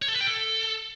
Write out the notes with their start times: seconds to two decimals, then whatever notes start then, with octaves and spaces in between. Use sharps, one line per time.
0.02 C#5
0.08 A4
0.14 B4
0.21 G5
0.27 A4